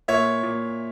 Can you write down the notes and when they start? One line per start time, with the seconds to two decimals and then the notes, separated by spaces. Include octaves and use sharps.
0.08 A#2 C#5 E5
0.43 A#2